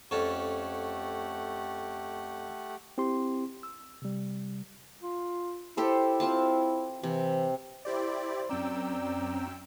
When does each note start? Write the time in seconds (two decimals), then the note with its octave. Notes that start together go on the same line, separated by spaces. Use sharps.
0.11 F2 A3 C#4 G4 A4 F#5
2.98 C4 E4 G4 C6
3.63 E6
4.02 C3 G3
5.03 F4
5.77 E4 G4 A4 C5
6.20 C4 F4 A5
7.03 C3 E3
7.85 E4 G4 C5 D5
8.49 F#2 C4 C#4 D5 G5 A#5 E6